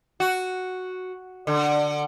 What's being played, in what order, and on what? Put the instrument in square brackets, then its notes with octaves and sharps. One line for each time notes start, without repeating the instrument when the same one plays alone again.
[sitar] F#4
D3